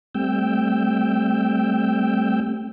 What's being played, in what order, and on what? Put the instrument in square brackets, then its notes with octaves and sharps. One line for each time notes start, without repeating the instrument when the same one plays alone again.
[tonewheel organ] G3 A3 C4 G5 E6 G6